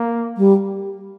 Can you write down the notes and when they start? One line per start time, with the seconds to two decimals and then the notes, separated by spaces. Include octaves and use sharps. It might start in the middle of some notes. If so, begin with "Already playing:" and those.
Already playing: A#3
0.37 G3